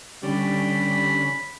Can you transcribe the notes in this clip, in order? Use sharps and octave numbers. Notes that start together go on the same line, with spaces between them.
D3 G3 C#4 B5